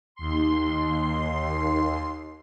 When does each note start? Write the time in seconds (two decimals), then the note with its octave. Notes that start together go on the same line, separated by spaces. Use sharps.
0.15 D#2 C6